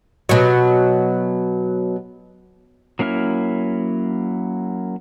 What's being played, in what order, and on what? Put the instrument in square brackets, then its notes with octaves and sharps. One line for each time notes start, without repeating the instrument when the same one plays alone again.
[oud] B2 F#3
[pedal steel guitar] F#3 A#3 C#4 E4 F6